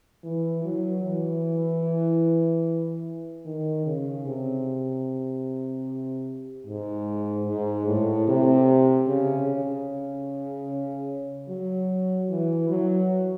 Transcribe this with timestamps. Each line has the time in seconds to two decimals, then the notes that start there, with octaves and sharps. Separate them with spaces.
0.24 E3
0.64 F#3
1.04 E3
3.46 D#3
3.86 C#3
4.26 C3
6.67 G#2
7.47 G#2
7.87 A2
8.28 C3
9.08 C#3
9.48 C#3
11.49 F#3
12.30 E3
12.70 F#3